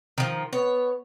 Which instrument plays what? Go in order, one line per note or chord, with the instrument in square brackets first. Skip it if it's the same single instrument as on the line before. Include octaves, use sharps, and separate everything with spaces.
[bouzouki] D#3 F3
[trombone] B3 [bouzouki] C#5